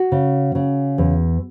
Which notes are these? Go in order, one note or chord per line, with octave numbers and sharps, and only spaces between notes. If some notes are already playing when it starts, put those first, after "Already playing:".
Already playing: F#4
C#3
C#3
E2